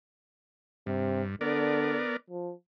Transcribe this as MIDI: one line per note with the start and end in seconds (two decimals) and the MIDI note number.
0.87 1.36 43
0.87 1.21 48
1.41 2.01 50
1.41 2.17 59
1.41 2.17 70
1.41 2.17 74
2.30 2.52 53